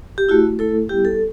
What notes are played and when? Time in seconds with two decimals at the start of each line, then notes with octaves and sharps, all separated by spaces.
0.18 G4
0.29 A3 E4 F#4
0.59 A3 E4 A4
0.89 G3 B3 E4 G4
1.05 A4